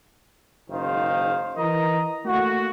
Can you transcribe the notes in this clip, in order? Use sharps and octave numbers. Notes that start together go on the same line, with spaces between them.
F#1 G#2 D#3 C5 F5
E3 A#4 D#5 A#5
A3 A#3 F#4